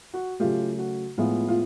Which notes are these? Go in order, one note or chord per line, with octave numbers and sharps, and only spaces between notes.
F#4
C#3 F#3 A3 F4 G4
F#4
A2 F3 G#3 B3 F4
F4